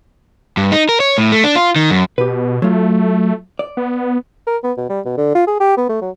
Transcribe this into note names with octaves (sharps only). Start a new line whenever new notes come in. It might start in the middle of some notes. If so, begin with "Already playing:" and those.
G2
D#4
A#4
C#5
A2
A3
D4
F4
D#3
F#2
B2 G4 B4
F#3 A3 F4
D5
B3
A#4
B3
B2
G3
B2
D3
F4
G#4
G4
B3
A3
F#3